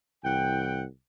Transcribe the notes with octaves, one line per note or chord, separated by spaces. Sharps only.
C2 E3 F#5 G5